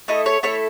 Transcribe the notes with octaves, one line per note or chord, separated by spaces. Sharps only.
A3 E4 A4 D#5
C#5
A3 E4 A4 C#5